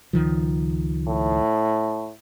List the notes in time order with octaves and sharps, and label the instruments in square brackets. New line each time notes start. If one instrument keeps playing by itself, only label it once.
[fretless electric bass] C#2 D#3 F3
[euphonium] A2